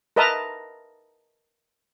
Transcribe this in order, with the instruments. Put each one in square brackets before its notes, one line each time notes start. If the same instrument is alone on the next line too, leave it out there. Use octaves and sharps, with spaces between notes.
[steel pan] A#4 B4 D#5 E5 A5 A#5